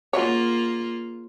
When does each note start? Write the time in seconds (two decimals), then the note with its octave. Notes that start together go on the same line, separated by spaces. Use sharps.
0.13 C#3 F#3 A#3 F4 C#5